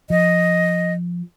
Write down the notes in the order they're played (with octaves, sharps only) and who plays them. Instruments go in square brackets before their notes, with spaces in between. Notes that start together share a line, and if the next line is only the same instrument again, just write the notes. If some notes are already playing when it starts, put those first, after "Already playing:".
[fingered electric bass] F3 [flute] D#5